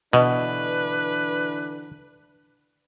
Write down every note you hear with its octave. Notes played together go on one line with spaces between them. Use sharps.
B2 D3 E3 D4 B4 D#5